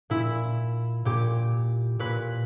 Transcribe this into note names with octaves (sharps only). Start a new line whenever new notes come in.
A#2 E4
A#2 G4
A#2 B4